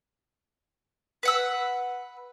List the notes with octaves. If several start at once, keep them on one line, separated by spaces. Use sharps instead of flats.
B4 F#5 E6